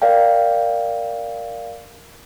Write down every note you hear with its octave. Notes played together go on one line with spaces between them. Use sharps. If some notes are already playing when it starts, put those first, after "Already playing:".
A#4 D5 F5 G5